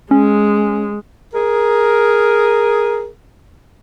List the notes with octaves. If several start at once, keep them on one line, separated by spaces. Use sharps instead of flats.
G#3 C#4
G#4 A#4